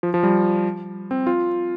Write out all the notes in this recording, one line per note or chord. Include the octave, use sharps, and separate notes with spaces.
F3
F3
G3
C4
F4